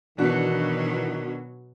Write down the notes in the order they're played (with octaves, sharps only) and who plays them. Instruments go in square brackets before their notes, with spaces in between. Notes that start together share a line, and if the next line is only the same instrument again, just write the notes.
[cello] B2 F#3 [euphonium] D#3 [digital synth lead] E3 [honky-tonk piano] B3 D4 F#4